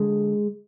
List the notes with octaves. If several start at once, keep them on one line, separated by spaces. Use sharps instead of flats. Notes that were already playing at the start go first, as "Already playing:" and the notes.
Already playing: D3 G#3